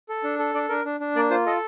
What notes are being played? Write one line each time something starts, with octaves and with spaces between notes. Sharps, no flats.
A4
D4
A4
D4 D5
D4 A#4
D4
D4
A#3 D5
F4 C5
A4 D#5